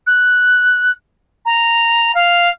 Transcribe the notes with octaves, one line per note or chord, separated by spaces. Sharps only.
F#6
A#5
F5